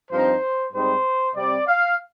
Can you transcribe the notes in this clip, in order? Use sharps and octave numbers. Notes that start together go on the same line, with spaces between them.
G2 F3 C4 D#4 C5
G#2 G3 C4 D#4 C5
C3 G3 C4 D5
F5